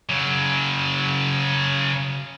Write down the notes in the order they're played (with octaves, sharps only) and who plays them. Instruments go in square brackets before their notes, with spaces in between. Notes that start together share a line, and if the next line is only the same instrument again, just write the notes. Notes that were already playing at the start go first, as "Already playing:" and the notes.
[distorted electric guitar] C#3 F#3